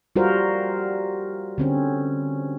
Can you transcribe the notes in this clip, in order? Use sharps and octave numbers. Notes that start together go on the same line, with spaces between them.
G3 F4 F#4 A#4 C5
D3 C4 C#4